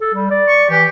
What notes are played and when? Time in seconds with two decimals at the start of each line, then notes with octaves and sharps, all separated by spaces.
0.01 A4
0.14 G3
0.31 D5
0.49 C#6
0.70 E3 G4